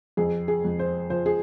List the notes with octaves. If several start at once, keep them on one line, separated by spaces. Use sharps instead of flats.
F2 G#4
G#4
F2
C5
F3 C5
G#4